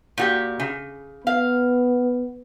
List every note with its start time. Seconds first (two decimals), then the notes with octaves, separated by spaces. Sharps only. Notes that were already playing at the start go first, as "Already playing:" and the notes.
0.18 A#2 F#4 G4
0.60 C#3
1.27 B3 F5